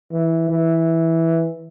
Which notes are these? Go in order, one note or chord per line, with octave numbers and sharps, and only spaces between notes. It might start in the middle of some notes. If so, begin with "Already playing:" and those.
E3
E3